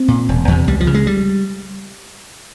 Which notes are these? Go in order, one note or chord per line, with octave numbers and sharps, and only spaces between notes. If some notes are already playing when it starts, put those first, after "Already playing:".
Already playing: C4
A#2
E1
E2 C3
C#2 G3
F3
C#3
G#3
G3